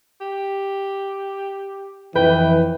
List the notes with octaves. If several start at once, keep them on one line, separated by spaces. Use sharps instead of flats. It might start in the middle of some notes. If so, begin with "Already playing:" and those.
G4
F2 E3 B4 G5